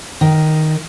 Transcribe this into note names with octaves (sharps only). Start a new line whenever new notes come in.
D#3